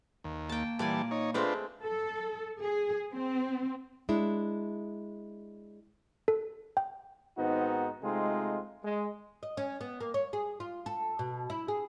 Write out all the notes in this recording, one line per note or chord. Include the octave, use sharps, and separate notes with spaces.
D#2
A#3 G5 A5
A#2 E3 G3 D5 G#5 A5
D#4 C#5
G#3 A3 C4 D4 F4 B4
A4
G#4
C4
G#3 D4 E4
A4
G5
G#2 D#3 B3 C4 D#4 F#4
C3 G#3 A3 C4 D#4 F4
G#3
D#5
C#4
B3
A#3
C#5
G#4
F4
A4
B2
E4
G#4